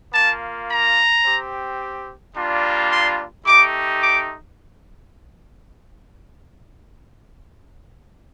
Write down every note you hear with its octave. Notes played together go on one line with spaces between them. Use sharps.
A#3 F4 A5
A#5
C4 G4
G3 A#3 D4 F4
C6
A3 D#4 G4 D6
D6